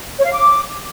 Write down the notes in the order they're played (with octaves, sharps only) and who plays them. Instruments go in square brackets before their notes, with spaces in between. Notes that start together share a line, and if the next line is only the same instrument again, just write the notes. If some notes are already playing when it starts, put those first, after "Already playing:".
[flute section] C#5
F5
D6